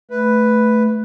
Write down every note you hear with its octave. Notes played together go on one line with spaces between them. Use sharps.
A3 B4